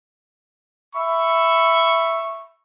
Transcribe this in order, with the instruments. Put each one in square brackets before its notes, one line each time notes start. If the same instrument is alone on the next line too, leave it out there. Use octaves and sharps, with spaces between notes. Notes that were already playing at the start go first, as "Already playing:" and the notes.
[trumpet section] E5 B5 C#6